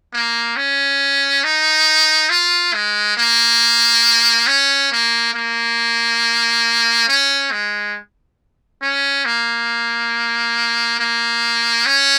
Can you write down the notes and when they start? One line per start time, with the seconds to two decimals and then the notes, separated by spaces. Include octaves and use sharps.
0.14 A#3
0.57 C#4
1.44 D#4
2.30 F4
2.74 G#3
3.17 A#3
4.48 C#4
4.92 A#3
5.34 A#3
7.08 C#4
7.51 G#3
8.82 C#4
9.26 A#3
10.99 A#3
11.86 C#4